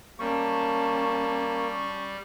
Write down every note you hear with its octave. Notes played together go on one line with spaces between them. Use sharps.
G3 A#3 C#4 A5 C#6